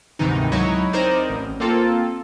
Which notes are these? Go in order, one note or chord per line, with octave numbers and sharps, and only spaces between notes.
D2 G#2 C3 D#3 E3 D#4
C#2 F#3 D#4 E4 C#5
C4 D#4 A#4 C5 D5
A1
A#3 C4 F4 A4